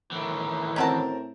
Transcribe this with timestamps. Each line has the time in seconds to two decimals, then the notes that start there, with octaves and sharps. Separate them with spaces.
0.12 A2 D#3 E3
0.76 C4 C#4 F#4 A#4 C5 A5